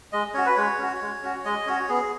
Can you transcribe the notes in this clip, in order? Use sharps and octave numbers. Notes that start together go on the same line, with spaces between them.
G#3 D#5
C#4 F#4 C#5
B4
G#3 C#5
C#4 F#4
G#3
C#4 F#4
G#3 D#5
C#4 F#4 C#5
B3 G#4